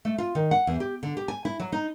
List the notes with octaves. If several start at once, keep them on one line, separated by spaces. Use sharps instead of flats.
A3
F4
D#3
F#5
E2
G4
D3
G4
G#5
E4
F#3
D#4